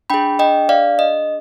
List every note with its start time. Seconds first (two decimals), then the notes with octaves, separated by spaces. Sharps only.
0.10 D4 G#4 G5 B5
0.39 D#5 G5
0.69 D5 F5
0.99 D#5